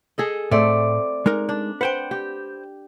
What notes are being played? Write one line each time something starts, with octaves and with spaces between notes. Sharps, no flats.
G#4 A4 D#5
A2 A3 C4 D5
G#3 D#4 A#4
D4
B4 C5 F#5 G5
G4